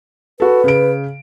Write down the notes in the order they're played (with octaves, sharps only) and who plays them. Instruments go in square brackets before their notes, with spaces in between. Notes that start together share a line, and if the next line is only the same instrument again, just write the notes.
[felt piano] F#4 A4 [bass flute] B4
[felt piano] C#3 D7